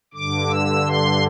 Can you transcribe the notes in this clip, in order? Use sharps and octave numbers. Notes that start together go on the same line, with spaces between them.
G2 D3 D6
E6
C6